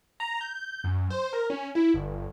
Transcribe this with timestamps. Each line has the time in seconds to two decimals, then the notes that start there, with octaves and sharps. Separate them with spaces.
0.20 A#5
0.41 G6
0.84 F#2
1.10 C5
1.33 A#4
1.50 C#4
1.75 E4
1.94 G1